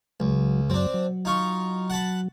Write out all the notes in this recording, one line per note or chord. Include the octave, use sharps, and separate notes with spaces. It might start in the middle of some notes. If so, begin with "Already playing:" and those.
C#2 F#3
F#2 F#3 C4 D4
F#3
D#4 F4 C#6
F#5 A5 B5